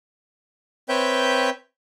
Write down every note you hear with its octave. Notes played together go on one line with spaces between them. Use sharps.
C4 B4 C#5 E5 G5 G6